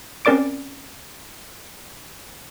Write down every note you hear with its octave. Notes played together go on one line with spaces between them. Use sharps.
C4 C#4 A#4 D5 D6 D7